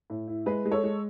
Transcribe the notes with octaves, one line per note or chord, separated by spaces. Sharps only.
A2
E4
G#3 G#4 B4
G#3
A4 C#5
G#3